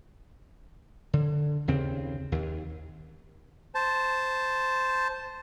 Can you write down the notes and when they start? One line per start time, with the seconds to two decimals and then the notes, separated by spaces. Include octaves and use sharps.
1.13 D3
1.68 D#2 C#3 C4
2.32 D#2
3.75 C5 A5